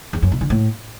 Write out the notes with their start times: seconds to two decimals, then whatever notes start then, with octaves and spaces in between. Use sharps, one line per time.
0.13 E2
0.22 F#2
0.32 B2
0.41 D3
0.50 A2